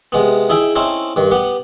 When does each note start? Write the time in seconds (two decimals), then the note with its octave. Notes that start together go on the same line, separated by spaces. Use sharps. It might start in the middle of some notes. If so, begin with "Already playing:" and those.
0.12 C3 G#3 B3
0.50 D#4 E4 G#4 E5 G5
0.75 C4 C#4 D#4 E4 A4 C5
1.16 G2 D#3
1.31 B3 G4 F#5